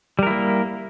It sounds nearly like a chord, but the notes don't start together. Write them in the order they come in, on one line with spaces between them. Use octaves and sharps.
G3 A#4 E4 A#3